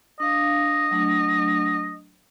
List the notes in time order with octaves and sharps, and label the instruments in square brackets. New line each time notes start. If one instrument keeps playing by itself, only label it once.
[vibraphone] D4 F5 [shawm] D#5
[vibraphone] F#3 A3 D4